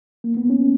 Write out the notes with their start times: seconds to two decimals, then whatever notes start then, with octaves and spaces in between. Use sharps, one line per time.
0.24 A#3
0.37 B3
0.50 C#4